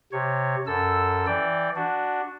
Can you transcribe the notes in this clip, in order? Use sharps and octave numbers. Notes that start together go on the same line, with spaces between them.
C3 C#5
F#2 A4 E6
E3 D5 G5
D4 F#4